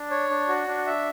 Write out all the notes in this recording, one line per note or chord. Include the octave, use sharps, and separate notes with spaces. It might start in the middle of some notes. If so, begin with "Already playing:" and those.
Already playing: D4
C#5
D4
F#4
D4
E5